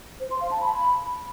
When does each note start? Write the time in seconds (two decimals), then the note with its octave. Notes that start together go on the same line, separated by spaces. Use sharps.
0.20 C5
0.31 C6
0.41 F5
0.51 A5
0.61 B5